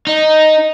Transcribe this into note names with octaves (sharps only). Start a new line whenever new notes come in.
D#4